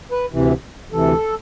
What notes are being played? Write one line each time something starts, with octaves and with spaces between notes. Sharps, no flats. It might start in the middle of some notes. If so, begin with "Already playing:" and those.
B4
D2 C3 E3
D2 C3 E3 A4